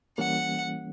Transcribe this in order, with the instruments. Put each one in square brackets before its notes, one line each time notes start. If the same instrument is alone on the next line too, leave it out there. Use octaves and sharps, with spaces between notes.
[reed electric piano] E3 G3 A#3 C#4 [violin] F#5